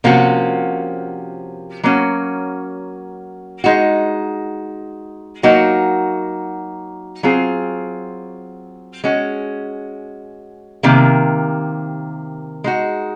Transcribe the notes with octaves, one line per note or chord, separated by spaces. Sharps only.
C3 F3 A#3 C#4 F#4
F#3 A#3 C#4 F#4
G#3 D#4 F#4
F#3 A#3 D#4 F#4
F#3 C4 F4 G#4
G#3 C#4 F#4
C3 D#3 A#3
G#3 D#4 F#4